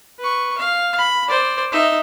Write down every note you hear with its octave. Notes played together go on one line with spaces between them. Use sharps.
B4 C#6
F5
B5
C5 D5
D#4 E5